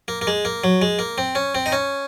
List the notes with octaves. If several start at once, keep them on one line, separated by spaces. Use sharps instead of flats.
A#3
A#3
G#3
A#3
F#3
G#3
A#3
C4
C#4
C4
D#4
C#4